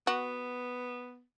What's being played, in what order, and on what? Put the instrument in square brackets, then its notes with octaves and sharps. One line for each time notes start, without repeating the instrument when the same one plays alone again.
[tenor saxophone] B3 [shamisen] F#4